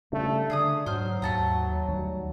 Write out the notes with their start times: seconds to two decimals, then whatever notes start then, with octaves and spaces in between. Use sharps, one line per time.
0.12 C#3 G3 A3 D4
0.50 D3 D4 G#4 A#5 D#6
0.86 G#2 F#3 C5 F6
1.22 D#2 G#2 A3 A5 A#5
1.88 D2 D#3 G3